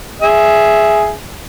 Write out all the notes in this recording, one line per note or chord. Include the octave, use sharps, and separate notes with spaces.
G#4 E5